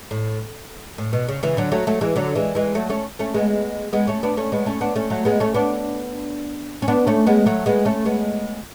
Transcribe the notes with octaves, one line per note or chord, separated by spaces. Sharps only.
A2
A2
B2
C#3
C#3 E3
D3 F#3
F#3 A3
F#3 A3
E3 G#3
D3 F#3
E3 G#3
E3 G#3
F#3 A3
A3 C#4
A3 C#4
G#3 B3
G#3 B3
A3 C#4
B3 D4
A3 C#4
G#3 B3
A3 C#4
B3 D4
A3 C#4
F#3 A3
G#3 B3
A3 C#4
B3 D4
C#4
B3 D4
A3 C#4
G#3 B3
F#3 A3
G#3 B3
A3 C#4
G#3 B3